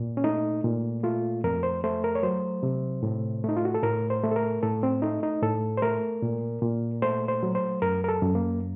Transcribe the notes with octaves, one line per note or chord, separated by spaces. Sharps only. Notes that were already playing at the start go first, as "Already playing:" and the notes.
Already playing: A#2
C#4
A3 D#4
A#2
A3 F4
F2 A#4
C5
A3 C5
A#4
C#5
F#3 C5
C3
A2
A3 D#4
F4
F#4
A4
A2 A#4
C5
A3
A4
A#4
A2 A4
C4
A3 D#4
D#4
A2 A4
C5
A3 A#4
A#2
A#2
A3 C5
C5
F#3
C5
F#2 A#4
A#4
A4
F#2
A#3